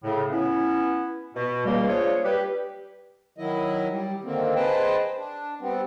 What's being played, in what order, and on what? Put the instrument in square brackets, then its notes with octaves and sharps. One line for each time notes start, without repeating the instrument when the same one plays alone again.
[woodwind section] A2 C#3
B3 C#4 E4
B2
C#2 G3 A#3
D4 F4 G#4 C5 C#5
G3 G4 B4
[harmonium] D#3 F#3 E4 D#5
G3
D3 D#3 A#3 C4
G#4 B4 C5 D#5 G5 A5
D4
G3 B3 C4